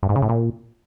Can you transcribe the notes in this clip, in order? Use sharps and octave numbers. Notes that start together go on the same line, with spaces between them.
G2
G#2
C#3
A2
A#2